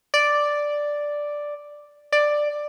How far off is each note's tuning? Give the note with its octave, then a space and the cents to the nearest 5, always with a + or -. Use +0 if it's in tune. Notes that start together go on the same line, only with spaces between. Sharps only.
D5 +0
D5 +10